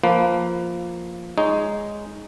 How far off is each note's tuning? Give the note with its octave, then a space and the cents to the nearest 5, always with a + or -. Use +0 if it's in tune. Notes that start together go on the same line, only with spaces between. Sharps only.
F3 +0 A#3 -5 B4 +15
G#3 +0 D#4 +0 C#5 +10